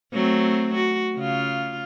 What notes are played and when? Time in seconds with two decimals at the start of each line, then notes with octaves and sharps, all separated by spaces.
0.13 F#3 A3 C4
0.75 F#4
1.16 C#3 F4